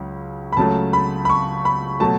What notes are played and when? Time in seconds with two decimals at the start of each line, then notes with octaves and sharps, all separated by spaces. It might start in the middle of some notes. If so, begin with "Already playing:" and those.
Already playing: C#2 C#3 F#3
0.52 B5
0.57 C#2 C#3 F#3 A3 A5
0.93 B5
1.25 B5
1.29 C#6
1.65 B5
2.00 B2 F#3 A3 A5